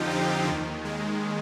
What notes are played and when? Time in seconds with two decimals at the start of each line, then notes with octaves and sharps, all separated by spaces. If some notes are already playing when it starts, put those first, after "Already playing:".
Already playing: F2 D3 F3 D#4 F4 G4
0.10 C4
0.48 D#2 D#3
0.85 G#3